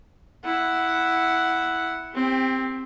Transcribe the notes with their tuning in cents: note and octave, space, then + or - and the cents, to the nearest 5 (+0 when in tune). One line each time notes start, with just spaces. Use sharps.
E4 +0 F#5 +0
C4 +0 G4 +25